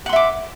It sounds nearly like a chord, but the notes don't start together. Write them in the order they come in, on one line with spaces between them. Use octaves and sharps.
F#5 C6 E5 D6